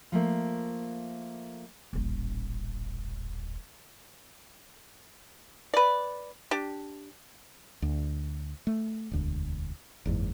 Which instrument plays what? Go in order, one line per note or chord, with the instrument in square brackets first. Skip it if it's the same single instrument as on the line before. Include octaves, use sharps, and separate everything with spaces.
[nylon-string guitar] F3 A3 A#3
[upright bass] D#1 A1
[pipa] B4 D5
D4 G4
[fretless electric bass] D2
A3
E1 D2
F#1 E2 G#2